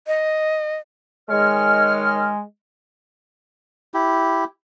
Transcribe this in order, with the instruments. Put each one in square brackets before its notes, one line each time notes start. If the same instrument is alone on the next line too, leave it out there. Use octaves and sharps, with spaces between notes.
[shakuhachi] D#5
[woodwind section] D#3 C#5 F6 [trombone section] G#3
[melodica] E4 G4